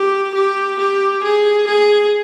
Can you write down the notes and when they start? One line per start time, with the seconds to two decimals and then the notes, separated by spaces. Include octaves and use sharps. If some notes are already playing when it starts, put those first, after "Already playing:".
Already playing: G4
0.34 G4
0.78 G4
1.23 G#4
1.67 G#4